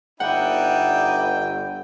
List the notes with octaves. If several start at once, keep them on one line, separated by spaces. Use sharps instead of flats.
G1 D#4 E4 D5 F#5 G5